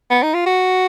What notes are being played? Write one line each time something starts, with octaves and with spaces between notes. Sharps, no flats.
B3
D#4
F4
F#4